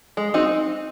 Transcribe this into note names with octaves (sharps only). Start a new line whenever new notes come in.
G#3
C4 D#4 F#4